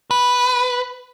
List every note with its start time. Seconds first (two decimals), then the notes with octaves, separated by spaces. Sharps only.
0.11 B4